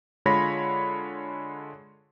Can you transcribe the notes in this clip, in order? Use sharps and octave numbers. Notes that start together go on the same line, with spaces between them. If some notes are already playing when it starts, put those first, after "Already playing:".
D3 G#3 F4 C#5 B5 A#6